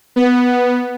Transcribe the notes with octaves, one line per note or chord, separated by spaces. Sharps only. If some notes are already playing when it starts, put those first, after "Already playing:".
B3